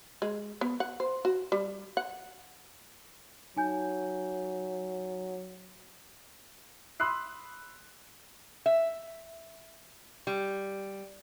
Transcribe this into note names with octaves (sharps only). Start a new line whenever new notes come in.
G#3
B3
F#5
C5
F#4
G3
F#5
F#3 D#4 G#5 G6
B5 C6 D#6 E6 F#6 C7
E5
G3